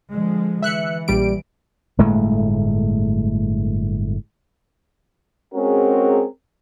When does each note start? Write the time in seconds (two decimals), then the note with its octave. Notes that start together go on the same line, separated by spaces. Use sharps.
0.12 D3 F3 G#3
0.62 E3 E5 F#6 C#7
1.08 A#1 G3 D7
1.98 G1 A2 G#3 A3
5.54 G#3 C4 C#4 F#4 G#4 A#4